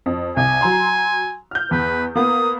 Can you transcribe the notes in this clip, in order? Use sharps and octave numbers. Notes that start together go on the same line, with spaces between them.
F2
C2 G#5
F#3 A#5 C6
F6 G6
E2 B4
A#3 B3 D#6